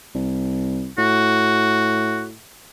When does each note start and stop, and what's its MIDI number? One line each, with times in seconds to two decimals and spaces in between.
0.15 0.89 36
0.98 2.36 45
0.98 2.25 66